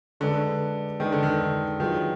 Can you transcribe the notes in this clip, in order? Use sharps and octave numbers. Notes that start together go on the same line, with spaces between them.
D3 G#3 D4 G#4 B4
D#3 G#3 D4 G#4 B4
D3
D#3
D#3 F#3 D4 F4 G#4 B4